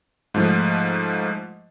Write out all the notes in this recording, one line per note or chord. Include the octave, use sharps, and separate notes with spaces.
G#2 F3 A3